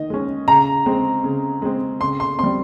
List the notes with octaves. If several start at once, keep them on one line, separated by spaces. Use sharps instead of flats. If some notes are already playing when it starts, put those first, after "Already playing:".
Already playing: D#3 D#5
G#3 C#4
C#3 A#5
G#3 C4
C#3
G#3 C4
C#3 C6
C6
C4 C6
G3